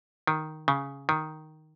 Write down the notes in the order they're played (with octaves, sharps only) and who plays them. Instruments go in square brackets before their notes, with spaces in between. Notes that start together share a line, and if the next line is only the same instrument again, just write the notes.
[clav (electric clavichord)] D#3
C#3
D#3